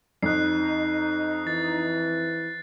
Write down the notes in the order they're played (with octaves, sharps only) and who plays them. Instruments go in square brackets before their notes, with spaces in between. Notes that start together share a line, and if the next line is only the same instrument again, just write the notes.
[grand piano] F2 [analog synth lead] D#4 [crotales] F#6 C7
[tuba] E3 [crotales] A6